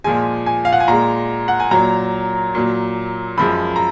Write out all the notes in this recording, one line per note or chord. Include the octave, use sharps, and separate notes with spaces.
A#2 F3 G#3 G#5
G#5
F5
F#5
G#5
A#2 G#3 A#5
F#5
G#5
A#2 F#3 A#5
A#2 F#3
F#2 F3 G#3 B5
A#5